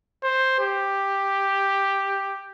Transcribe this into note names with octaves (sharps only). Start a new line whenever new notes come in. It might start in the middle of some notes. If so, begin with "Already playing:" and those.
C5
G4